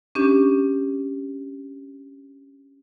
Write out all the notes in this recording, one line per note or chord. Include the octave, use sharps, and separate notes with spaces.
C#4 D4 G4